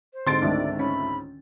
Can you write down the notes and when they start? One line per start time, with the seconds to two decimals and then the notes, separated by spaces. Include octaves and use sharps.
0.13 C5
0.27 G#2 D3 C4 C6 A6 D7
0.42 C#2 D#3 A3 D4 D5
0.79 C#4 B5